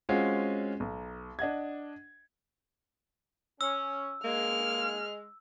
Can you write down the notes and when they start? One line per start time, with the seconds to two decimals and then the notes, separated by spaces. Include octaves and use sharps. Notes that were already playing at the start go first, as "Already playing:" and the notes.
0.09 G#3 C4 C#4 F4 F#4
0.80 B1
1.39 D4 D#5 F#5 G#6
3.61 C#4 E6
4.24 G#3 A#3 F6